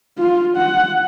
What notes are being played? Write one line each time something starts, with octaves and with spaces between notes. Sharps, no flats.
F4
F#5